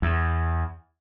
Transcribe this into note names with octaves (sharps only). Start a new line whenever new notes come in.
E2